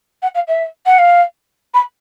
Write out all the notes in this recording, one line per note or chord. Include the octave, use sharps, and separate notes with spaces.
F#5
F5
E5
F#5
F5
B5